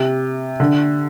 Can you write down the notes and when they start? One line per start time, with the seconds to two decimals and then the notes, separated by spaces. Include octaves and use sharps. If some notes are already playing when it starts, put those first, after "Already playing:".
Already playing: C3
0.60 D3